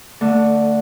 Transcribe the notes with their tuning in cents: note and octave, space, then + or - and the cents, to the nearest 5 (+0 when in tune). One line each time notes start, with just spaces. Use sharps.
D3 +0 A3 +25 A4 +0